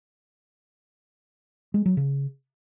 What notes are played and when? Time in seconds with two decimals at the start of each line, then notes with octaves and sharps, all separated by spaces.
1.74 G#3
1.86 F#3
1.97 C#3